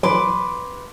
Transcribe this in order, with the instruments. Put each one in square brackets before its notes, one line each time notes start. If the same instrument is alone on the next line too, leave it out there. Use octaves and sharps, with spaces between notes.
[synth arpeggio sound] E3 F#3 [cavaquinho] B4 C6 D6